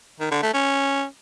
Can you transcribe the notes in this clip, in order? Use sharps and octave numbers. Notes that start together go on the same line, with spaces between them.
D#3
D3
A3
C#4